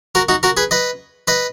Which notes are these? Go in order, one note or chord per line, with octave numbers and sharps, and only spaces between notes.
F#4 A#4
D#4 F#4
F#4 A#4
G#4 B4
B4 D#5
B4 D#5